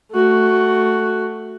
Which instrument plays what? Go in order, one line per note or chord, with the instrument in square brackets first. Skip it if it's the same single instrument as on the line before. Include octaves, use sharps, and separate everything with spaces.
[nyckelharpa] A3 F#4